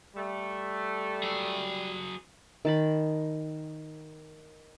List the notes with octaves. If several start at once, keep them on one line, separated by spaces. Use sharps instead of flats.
G3 A3
F#3 G#4
D#3 A5 B5